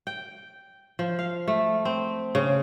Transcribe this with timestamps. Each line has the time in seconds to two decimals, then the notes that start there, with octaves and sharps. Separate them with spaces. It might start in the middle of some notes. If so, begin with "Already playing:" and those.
0.07 G5
0.99 F3
1.19 F5
1.48 A3
1.85 C4
2.35 C#3